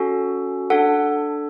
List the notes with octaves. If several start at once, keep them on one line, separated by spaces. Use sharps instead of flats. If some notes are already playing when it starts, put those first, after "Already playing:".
Already playing: C#4 F#4 A4
D4 A4 F#5